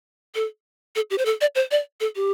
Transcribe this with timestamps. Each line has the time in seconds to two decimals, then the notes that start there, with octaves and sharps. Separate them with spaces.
0.35 A4
0.96 A4
1.10 G4
1.18 C5
1.26 A4
1.41 D5
1.55 C5
1.71 D5
2.00 A4
2.16 G4